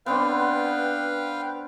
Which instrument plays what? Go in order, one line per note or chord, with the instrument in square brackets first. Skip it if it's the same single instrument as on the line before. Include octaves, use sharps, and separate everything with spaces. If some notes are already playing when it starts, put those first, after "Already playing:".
[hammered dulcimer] B3 C4 D4 [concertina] B4 F5 G5